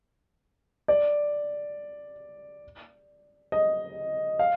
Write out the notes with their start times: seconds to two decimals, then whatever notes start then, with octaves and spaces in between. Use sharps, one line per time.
0.88 D5
3.52 D#5
4.39 F5